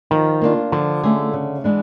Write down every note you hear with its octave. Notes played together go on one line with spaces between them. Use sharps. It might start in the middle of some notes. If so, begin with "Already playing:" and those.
D#3 F3
A#3 D4 F4
D3 F3
A3 C#4 F4 G#4
C#3
E3 G#3 B3 D4